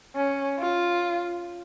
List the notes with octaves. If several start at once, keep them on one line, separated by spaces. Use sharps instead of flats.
C#4
F4